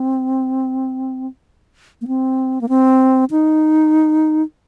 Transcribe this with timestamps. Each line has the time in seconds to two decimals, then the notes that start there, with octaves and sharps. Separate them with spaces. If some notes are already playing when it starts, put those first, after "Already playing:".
Already playing: C4
2.01 A#3
2.08 C4
2.61 A#3
2.69 C4
3.31 D#4